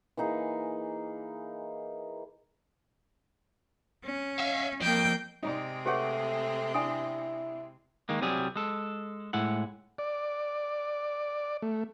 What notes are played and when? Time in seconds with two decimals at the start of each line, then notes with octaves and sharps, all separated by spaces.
0.17 E3 A#3 D#4 G#4
4.05 C#4
4.40 E5 F5
4.82 F2 A#3 G5
5.43 C3 G#3 C4 D#4 D5
5.86 A3 G4 G#4 B4 C#5 F#5
6.74 D4 E4 E5 G#5 D#6
8.09 D#3 G#3 A#3
8.21 C2 C3 F#3 G3 G#4
8.56 G#3 A4
9.33 A2 G#3 E4 F#5
9.98 D5
11.62 A3